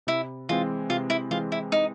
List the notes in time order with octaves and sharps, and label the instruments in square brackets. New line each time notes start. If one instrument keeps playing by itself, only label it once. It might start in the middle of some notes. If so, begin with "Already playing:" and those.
[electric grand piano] C3 [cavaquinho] E4
[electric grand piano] E3 G#3 C4 [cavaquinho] F4
[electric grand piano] C3 [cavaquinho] F4
[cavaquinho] E4
[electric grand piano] E3 G#3 C4 [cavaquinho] F4
[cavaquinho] E4
D#4